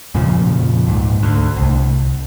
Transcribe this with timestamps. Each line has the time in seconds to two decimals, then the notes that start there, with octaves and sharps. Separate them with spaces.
0.15 F2 A#2 C#3 F3
0.86 C#2 G#2
1.23 D2
1.56 C2